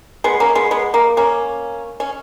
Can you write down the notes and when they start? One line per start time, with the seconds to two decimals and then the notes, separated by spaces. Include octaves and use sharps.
0.24 G#3 B3
0.40 A#3 C#4
0.55 G#3 B3
0.71 G#3 B3
0.94 A#3
1.17 A#3 C#4
2.00 C#4